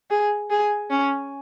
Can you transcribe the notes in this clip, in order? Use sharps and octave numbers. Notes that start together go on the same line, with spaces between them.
G#4
G#4
C#4